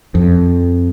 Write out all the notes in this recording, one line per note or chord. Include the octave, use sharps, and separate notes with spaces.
F2